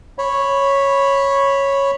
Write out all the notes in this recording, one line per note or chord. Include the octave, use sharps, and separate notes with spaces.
C#5 B5